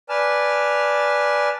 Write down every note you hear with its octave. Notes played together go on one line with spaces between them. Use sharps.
B4 D5 G#5 A5 F6